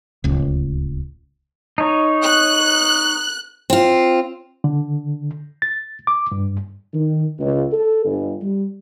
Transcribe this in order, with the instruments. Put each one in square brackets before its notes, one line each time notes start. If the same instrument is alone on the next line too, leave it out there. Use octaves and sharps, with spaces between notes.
[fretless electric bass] D1 C#2
[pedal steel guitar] D#4 C#5
[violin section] F#6
[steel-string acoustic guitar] C4 F4
[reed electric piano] D3
A6
D6
G2
[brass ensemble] D#3
C#2
A4
G1
G3